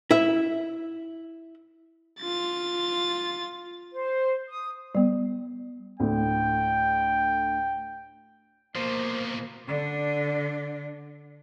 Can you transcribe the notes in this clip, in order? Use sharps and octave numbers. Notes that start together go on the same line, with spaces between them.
E4 E5
F4 A6
C5
D#6
G3 B3
D2 A2 G5
B2 F3 A#3 C5
D3 D4